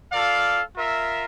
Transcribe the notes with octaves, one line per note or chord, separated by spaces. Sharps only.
F4 A4 D5 F5
F4 A#4 E5